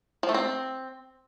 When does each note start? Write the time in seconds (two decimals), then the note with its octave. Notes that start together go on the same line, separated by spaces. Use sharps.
0.23 F3
0.29 A3
0.34 C4